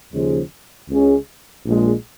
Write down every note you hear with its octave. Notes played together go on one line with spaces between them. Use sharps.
D#2 C#3 F3 G#3
C#2 C#3 G#3 C#4 G#4
A#1 A#2 G#3